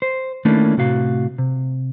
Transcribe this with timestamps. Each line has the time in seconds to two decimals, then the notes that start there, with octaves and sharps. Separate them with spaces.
0.02 C5
0.45 D#3 A3 A#3 C#4 D4 E4
0.77 A2 C3 F#4 F5
1.38 C3